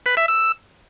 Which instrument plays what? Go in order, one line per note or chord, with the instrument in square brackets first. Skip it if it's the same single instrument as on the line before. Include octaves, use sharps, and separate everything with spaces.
[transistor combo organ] B4
E5
E6